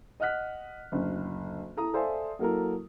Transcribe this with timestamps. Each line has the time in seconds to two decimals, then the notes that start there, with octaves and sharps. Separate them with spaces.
0.20 D#5 F#5 F6 F#6 B6
0.92 F#1 D2
1.77 E4 A4 A#5 D#6
1.94 A4 C5 D5 E5 F5 G#5
2.39 F#3 A#3 E4 A4 A#4